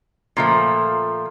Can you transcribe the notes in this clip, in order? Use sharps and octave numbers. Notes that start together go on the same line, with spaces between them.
A#2 F3 A3